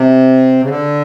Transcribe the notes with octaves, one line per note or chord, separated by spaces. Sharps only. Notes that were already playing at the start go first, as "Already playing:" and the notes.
Already playing: C3
C#3
D3